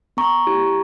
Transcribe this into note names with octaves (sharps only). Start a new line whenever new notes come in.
B3 A#5 C#6
E4 G4